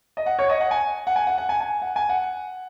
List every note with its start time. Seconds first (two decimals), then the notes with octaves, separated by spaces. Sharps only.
0.17 D#5
0.26 F#5
0.39 C#5
0.49 D#5
0.60 F#5
0.71 G#5
1.07 F#5
1.16 G#5
1.27 F#5
1.38 F#5
1.49 G#5
1.60 G#5
1.82 F#5
1.96 G#5
2.09 F#5